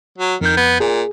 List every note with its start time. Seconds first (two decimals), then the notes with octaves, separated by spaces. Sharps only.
0.18 F#3
0.41 F2 D#3 G6
0.57 B3
0.80 A#2 G#4